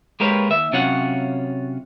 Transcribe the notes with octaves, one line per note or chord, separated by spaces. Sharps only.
G#3 A#3 G4 A#4 B4 C#5
D#2 E5
C3 F#3 C#4 F4 C#5 F#5